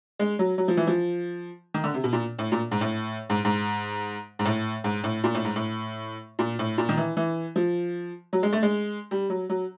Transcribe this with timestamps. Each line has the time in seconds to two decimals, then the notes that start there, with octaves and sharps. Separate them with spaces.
0.19 G#3
0.39 F#3
0.58 F#3
0.68 F3
0.77 E3
0.87 F3
1.74 D#3
1.84 D3
1.94 C3
2.04 B2
2.13 A#2
2.39 A2
2.52 A#2
2.71 G#2
2.81 A2
3.30 G#2
3.45 G#2
4.39 G#2
4.45 A2
4.84 G#2
5.04 A2
5.24 A#2
5.34 A2
5.45 G#2
5.56 A2
6.39 A#2
6.59 A2
6.78 A#2
6.89 D#3
6.97 E3
7.17 E3
7.56 F3
8.33 F#3
8.43 G#3
8.53 A3
8.63 G#3
9.11 G3
9.30 F#3
9.49 F#3